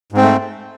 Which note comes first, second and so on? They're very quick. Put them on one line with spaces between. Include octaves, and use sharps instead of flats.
G#2 C4 A3